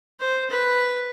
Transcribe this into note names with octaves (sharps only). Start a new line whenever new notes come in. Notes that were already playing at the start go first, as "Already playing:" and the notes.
C5
B4